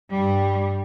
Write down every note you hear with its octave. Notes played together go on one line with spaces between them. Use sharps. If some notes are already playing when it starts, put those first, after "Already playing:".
G2 G3